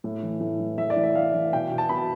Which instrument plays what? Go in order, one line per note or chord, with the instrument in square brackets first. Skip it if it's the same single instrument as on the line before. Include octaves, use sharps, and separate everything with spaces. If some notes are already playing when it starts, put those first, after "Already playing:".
[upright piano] A2
E3
A2
E3
A2 E5
D5
E3
E5
A2 F5
E3
B2 G5
B2
A5
B2 B5